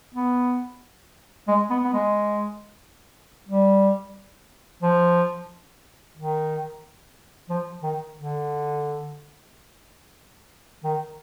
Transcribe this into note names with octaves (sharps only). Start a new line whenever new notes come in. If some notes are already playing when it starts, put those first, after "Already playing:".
B3
G#3
B3
B3
G#3
G3
F3
D#3
F3
D#3
D3
D#3